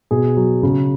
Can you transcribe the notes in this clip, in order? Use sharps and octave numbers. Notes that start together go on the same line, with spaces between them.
B2 G#4
F#3
C#3